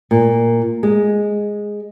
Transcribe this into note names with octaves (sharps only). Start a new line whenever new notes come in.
A#2
G#3